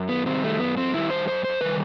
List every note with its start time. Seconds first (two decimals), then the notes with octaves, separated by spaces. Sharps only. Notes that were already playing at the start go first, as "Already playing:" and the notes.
Already playing: F#2
0.09 B3
0.26 D#3 G3 C4
0.44 A3
0.59 F#2 B3
0.77 C4
0.94 D#3 G3 E4
1.11 C5
1.27 F#2 C5
1.44 C5
1.61 D#3 G3 B4